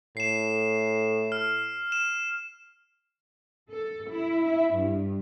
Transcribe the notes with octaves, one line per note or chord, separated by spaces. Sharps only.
A2 C7 E7
F6
E7
A4
E4
E4
G2